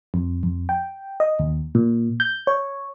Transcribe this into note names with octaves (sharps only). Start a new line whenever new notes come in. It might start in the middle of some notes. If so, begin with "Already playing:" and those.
F2
F2
G5
D#5
D#2
A#2
G6
C#5